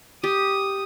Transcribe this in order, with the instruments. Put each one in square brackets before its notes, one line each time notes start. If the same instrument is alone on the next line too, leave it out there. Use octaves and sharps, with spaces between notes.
[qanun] G4 [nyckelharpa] D#6